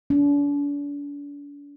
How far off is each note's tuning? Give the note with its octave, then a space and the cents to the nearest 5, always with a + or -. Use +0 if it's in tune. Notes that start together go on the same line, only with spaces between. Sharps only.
D4 -40